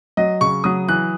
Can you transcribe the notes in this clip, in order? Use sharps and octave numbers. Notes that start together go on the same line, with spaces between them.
F#3 D#5
C#3 C#6
F#3 D#6
E3 F#6